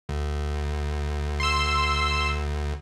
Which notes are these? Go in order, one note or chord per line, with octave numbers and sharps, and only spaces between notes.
D2
C6 E6